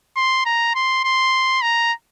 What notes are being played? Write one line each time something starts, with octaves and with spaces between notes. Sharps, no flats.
C6
A#5
C6
C6
A#5